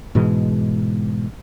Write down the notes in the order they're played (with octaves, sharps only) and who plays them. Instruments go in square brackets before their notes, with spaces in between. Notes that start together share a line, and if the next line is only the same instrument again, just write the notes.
[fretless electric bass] G#2 B2 E3 G#3